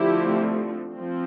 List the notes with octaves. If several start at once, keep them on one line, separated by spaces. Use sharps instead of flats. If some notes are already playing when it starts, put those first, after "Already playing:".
Already playing: D3 F3 A3 C4 E4 G4
F3 C4